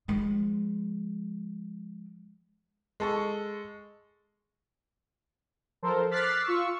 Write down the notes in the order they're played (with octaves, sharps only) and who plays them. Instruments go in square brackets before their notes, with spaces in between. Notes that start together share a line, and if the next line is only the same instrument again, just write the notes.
[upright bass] F3 G#3
[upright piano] G#3 A4 C#6
[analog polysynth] F3 A4 A#4 C5
D6 F6 F#6 A6 B6 C7
F4 C#6 E6